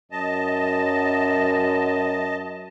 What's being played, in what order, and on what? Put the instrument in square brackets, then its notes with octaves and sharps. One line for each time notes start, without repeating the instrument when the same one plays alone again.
[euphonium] F#2 [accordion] D#5 A5